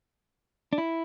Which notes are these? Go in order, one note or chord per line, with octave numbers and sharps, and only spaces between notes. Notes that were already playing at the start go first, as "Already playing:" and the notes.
D4
E4